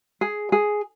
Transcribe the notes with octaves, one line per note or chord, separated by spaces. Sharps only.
G#4
G#4